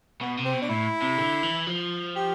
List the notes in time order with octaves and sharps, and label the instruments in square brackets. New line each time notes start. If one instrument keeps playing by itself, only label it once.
[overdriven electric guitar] B2 [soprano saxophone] B3
[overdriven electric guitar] C3
[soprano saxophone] C4
[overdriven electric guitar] B2
[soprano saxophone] D4
[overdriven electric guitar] A2 [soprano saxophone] E4
[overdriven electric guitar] C3
D3
E3
F3
[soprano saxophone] G4